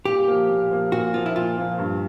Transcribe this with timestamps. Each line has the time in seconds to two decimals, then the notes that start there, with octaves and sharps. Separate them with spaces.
0.05 A#2 G4
0.28 F3 A#3
0.49 A#2
0.71 F3 A#3
0.92 A#2 F#4
1.14 F3 A#3 F4
1.26 E4
1.35 A#2 F4
1.57 F3 A#3
1.79 G2